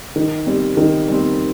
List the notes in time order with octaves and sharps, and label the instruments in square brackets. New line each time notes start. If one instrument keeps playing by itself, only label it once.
[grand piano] D#3
G3 C4
D#3
G3 C4